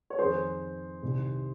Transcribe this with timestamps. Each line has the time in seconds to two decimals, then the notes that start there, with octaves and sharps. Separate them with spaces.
0.10 C#5
0.18 F2 D#3 G#4 C5
1.03 C2 C3 D#3